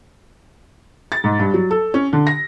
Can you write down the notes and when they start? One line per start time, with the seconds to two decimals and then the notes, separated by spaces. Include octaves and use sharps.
1.12 A6
1.24 G#2
1.39 G2
1.54 F#3
1.71 A4
1.94 C#4
2.13 D3
2.27 A#6